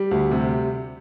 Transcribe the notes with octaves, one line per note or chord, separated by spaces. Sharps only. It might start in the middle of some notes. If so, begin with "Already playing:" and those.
Already playing: G3
D2
C3